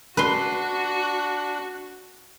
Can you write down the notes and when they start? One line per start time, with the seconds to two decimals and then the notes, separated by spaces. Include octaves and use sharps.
0.17 D4 F#4 B4 C6